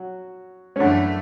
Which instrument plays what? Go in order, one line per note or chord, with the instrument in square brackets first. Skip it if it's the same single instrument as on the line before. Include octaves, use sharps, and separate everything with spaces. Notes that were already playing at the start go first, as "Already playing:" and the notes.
Already playing: [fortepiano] F#3 F#4
C#4
[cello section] F#2 E3 A3 [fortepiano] D3 D4